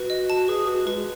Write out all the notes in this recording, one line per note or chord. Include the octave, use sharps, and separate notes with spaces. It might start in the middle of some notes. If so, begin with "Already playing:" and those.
Already playing: F#4 B4
D#5
A5
G#4 B4
F#4 B4
G#3 B4